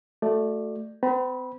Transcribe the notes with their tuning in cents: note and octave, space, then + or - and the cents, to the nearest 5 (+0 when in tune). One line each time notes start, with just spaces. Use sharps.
A3 +0 F#4 -20 D5 +20
C4 -45 B5 -20